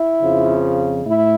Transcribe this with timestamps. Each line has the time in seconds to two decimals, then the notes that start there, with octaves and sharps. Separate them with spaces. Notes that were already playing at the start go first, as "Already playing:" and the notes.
Already playing: E4
0.21 F2 C#3 F3
1.05 A2 E4